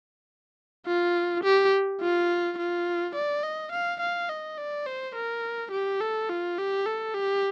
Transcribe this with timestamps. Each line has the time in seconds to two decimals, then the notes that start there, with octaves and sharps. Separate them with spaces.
0.86 F4
1.44 G4
2.01 F4
2.58 F4
3.16 D5
3.44 D#5
3.72 F5
4.01 F5
4.29 D#5
4.58 D5
4.86 C5
5.15 A#4
5.72 G4
6.01 A4
6.30 F4
6.58 G4
6.86 A4
7.15 G4